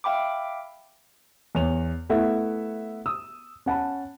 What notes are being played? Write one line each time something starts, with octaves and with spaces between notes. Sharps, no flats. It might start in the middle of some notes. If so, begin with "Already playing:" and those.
E5 F5 G5 B5 D6
E2 C#5 F7
A3 B3 E4 E5 F#5
D#6 E6
C#4 F#5 A5 B5